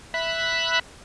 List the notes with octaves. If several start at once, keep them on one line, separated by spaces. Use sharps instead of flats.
E5 B5 F#6